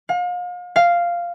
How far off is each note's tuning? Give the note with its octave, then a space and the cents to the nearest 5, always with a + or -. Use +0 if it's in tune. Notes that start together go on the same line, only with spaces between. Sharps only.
F5 +40
F5 -5